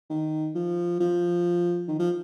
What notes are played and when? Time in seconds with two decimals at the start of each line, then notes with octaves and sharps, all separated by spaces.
0.09 D#3
0.55 F3
1.00 F3
1.88 D#3
1.99 F3